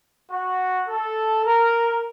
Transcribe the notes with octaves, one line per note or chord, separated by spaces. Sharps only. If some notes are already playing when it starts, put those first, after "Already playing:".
F#4
A4
A#4